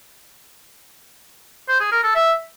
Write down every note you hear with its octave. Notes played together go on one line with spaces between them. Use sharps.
C5
G#4
A#4
A4
E5